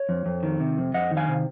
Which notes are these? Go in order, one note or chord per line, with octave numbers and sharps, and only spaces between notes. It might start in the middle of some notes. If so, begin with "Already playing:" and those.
Already playing: C#5
F2
F2
D#3
C3
F2
F2 D#5 F#5
D#3
F5 G#5
C3